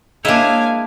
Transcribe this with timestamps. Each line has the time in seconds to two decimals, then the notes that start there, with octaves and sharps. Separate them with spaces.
0.25 G#3 A#3 D4 E4 C#5 D#5 F5 G#5